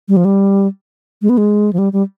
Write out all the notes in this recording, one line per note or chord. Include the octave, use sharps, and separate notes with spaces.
G3
F3
G3
G#3
B3
G#3
F3
G3
G3